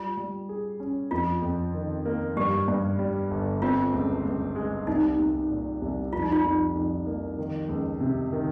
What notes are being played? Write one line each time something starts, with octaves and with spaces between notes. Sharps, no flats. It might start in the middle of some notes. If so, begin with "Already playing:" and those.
Already playing: G3 F4
G3
G#4
C#4
F2 F4
F2
D#3
A#3
G2 G4
G2
G3
G1
C4 F4
C#2
C#2
G#3
C2 D#4
C2
A#2
C2
F2 F4
D#4
F4
F2
F2
A#3
D#3
C#2
C3
D#3